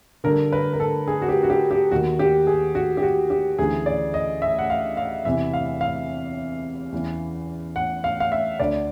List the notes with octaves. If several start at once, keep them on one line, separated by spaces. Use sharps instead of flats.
G2 D3 A#4
B4
A#4
A4
G#4
F#4
G4
F#4
G4
G4
D#2 D#3 F#4
G4
G#4
F#4
G4
F#4
G4
D2 C#3 E3 G#4
D5
D#5
E5
F#5
F5
F5
E2 C3 E3 E5
F5
F5
E2 C#3 E3
F#5
F5
F5
E5
D2 D3 D5